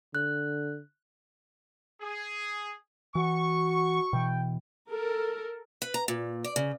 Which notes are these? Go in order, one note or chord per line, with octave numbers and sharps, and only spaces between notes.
D3 F#6
G#4
E3 F#4 C#6
B2 E3 G5
A4 A#4
B4
A#5
A#2
D5
C#3